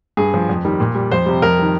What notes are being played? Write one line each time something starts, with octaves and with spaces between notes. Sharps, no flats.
G2 G#4
F3
F2
D#3 G3
A#2
G3
F2 C5
C3 G3
F2 A#4
D#3 G3